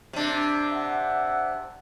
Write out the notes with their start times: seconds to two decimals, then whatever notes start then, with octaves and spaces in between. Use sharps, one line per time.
0.13 C3 D4
0.73 E5 F#5